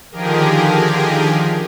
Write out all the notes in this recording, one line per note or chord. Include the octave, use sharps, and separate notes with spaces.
D3 D#3 F3 G4 G#4 A#4